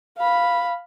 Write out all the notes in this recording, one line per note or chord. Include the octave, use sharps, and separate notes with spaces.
F5 B5